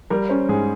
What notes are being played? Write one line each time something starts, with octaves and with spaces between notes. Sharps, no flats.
G3 A#4
C#4 C5
G#2 G#4